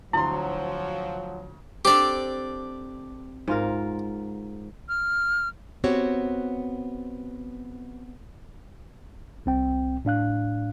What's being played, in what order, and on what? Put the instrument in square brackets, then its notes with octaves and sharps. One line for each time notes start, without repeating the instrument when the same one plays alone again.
[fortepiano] D2 A#5 C6 [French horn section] F3 F#3 [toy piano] E4
[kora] C4 D4 A4 [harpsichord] G4 D5
[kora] G#2 F4 A#4
[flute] F6
[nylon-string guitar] B3 C4 F#4 G4 C#5
[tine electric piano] C2 C4 G5
A2 D4 F5 F#6